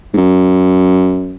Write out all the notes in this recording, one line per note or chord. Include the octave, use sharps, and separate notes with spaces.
G#2
F#2